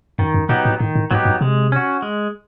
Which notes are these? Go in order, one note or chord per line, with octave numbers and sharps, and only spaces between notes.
F#2 D#3
F#2
A#2 F#3 B3 D#4 G4
A2
A2 D#3
A2
G#2 F#3 B3 D#4 G4
G2
C3 G#3
C#4 F#4
G#3